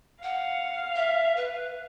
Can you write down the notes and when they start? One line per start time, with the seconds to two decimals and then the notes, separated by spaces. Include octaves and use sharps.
0.23 F5 F#5
0.96 E5
1.36 B4